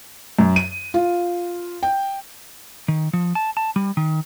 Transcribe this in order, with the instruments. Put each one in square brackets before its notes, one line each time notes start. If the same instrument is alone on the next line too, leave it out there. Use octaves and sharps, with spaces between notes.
[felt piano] F#2
D#7
F4
G5
[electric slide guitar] D#3
F3
A5
A5
G3
D#3